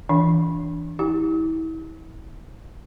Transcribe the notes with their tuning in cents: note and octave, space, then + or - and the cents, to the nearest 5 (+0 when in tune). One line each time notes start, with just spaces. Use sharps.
E3 -5 D4 -10
E4 -35 G4 +10